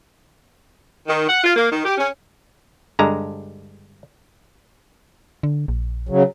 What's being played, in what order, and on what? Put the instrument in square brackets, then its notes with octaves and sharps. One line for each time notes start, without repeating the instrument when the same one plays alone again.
[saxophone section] D#3
F#5
F4
A#3
D#3
G4
C#4
[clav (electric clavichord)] G2 D3 G#3 A#5
[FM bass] D3
A#1
[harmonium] C#3 F#3